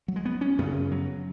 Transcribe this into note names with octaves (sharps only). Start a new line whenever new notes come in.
F#3
G#3
B3
C#4
F#2 C#3 B3
F#3